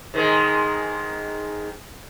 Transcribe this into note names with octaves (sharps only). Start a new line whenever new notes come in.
G#2 D#3 G#3